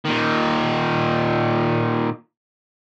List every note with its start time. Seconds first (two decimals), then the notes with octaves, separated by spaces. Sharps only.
0.05 A#2 D#3